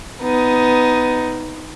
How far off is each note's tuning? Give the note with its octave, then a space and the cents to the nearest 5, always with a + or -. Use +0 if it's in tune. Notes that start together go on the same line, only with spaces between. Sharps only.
B3 +15 D#4 +10